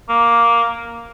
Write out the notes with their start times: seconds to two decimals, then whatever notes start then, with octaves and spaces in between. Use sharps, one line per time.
0.09 A#3